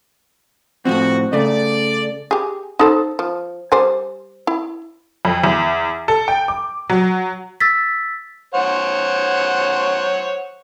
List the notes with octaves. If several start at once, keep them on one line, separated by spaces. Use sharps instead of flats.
A2 F3 C4 F#4
C#3 A3 D5
G4 G#4
D#4 A4 C5
F3
G3 C5 G#5
E4
F2
E2
A4
G5
D6
F#3
E6 A6 B6
C5 C#5 F#5